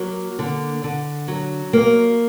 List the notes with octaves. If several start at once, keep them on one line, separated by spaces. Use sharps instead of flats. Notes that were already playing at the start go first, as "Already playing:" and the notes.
Already playing: F#3 A#3
D3
D3
F#3
A#3